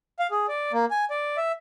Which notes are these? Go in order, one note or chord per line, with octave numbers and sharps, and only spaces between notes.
F5
G#4
D5
A#3
G#5
D5
E5